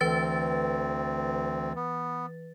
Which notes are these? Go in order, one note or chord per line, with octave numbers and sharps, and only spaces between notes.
D2 E3 C4 B4 A6
B3